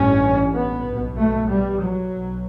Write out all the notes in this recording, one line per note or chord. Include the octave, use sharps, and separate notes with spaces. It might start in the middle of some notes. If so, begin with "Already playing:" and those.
Already playing: A1 G2 C#4
B3
B1 B2
A3
G3
F#3
B1 B2